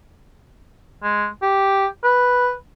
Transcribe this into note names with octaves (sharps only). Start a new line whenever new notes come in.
G#3
G4
B4